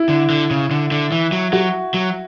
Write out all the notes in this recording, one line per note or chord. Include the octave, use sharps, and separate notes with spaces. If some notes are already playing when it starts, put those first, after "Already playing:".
Already playing: E4
D3
D3
C#3
D3
D3
E3
F#3
F#3 F#4
F#3